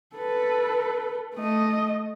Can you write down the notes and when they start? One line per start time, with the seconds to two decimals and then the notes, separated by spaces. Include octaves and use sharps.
0.16 A4 B4
1.35 A3 D#5